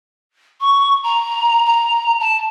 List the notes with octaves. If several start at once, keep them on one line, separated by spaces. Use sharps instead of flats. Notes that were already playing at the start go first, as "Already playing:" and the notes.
C#6
A#5
A#5
A5